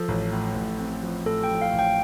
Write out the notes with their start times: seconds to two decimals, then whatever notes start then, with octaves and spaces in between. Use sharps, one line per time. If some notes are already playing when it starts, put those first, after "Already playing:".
Already playing: F3 A4
0.08 A1
0.32 A2
0.55 A1
0.78 C4
1.03 F3
1.26 A2 A4
1.43 G5
1.49 F3
1.61 F5
1.73 A1
1.79 G5